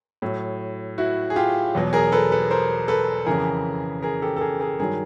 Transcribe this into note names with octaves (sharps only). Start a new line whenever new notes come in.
A2 F#3
E4 F#4
G#4
F4 G4
E2 B2 F#3
G#4 A#4
A4 B4
A4 B4
A#4 C5
A4 B4
F2 C#3 E3 G#4 A#4
G#4 A#4
G4 A4
A4
G#4 A#4
G#4 A#4
G2 D#3 F#3 G#4 A#4